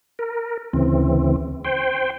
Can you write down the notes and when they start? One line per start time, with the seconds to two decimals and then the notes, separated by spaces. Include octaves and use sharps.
0.19 A#4
0.73 D2 C#3 E3 C4
1.65 C5 G5